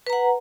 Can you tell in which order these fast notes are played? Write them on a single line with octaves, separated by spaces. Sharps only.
B4 A#5 F#5